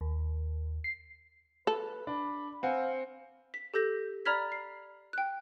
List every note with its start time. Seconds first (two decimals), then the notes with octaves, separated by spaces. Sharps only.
0.01 D#2
0.84 C7
1.67 A4 B4
2.07 D4 B5
2.63 C4 F5 F#5 G#5
3.54 B6
3.74 G4 A4 G6 A#6
4.25 D5 A#5 B5 F6 G#6 B6
4.52 C7
5.13 G5 F#6